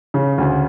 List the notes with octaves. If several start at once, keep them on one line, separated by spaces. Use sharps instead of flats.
C#3
D2